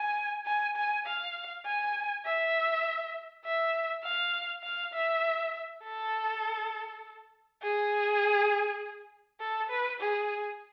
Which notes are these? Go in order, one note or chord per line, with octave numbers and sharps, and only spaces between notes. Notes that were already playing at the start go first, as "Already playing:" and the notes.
Already playing: G#5
G#5
G#5
F5
G#5
E5
E5
F5
F5
E5
A4
G#4
A4
B4
G#4